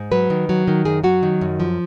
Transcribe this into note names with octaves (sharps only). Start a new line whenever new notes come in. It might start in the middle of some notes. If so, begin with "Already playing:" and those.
Already playing: G#2
F#3 B4
D#3
F#3
D#3
F#2 G#4
F#3 F#4
D#3
F#2
F3